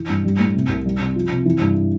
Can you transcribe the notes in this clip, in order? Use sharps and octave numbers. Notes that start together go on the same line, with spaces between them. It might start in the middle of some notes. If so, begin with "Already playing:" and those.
Already playing: E3
G2
G3
A2
C3
C2
G3
C3
F3
C3
E3
G2